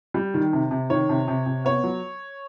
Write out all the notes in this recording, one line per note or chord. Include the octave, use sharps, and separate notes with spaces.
G3
D#3
C3
C3
D#3 C#5
C3
C3
C3
B3 C#5
F#3